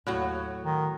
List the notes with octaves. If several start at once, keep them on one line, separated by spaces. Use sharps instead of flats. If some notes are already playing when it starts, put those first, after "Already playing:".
D#2 A2 F#3 F#4
D#3